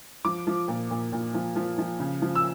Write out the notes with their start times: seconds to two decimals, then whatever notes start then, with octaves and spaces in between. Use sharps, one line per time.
0.25 F3 D6
0.47 F3
0.68 A#2
0.90 A#2
1.12 A#2
1.34 F3
1.56 F3
1.78 F3
2.00 C#3
2.22 F3
2.35 E6